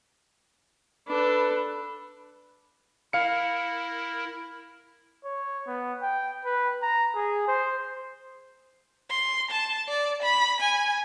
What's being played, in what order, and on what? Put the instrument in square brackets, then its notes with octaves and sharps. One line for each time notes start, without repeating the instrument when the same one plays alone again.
[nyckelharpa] D4 A4 [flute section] B4 B5
[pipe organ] E4 A#4 [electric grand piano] F5 C#7
[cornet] C#5
B3
G5
B4
A#5
G#4
C5
[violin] C6
A5
D5
B5
G#5